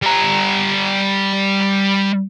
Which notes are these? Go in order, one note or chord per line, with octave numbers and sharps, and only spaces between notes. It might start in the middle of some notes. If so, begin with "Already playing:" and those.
G3 A#5